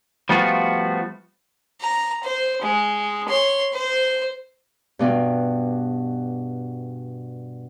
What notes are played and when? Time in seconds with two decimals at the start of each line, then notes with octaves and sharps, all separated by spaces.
0.29 F3 G3 A3 B3 F4 F#4
1.81 A#5
2.23 C5
2.62 G#3
3.28 C#5 C6
3.72 C5
4.99 G2 B2 G3